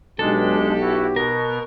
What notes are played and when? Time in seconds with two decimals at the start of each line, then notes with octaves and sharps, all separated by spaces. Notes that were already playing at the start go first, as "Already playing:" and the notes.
0.19 B1 G#3 D4 G4 A4
0.81 E4 F#4
1.16 B2 B3 A#4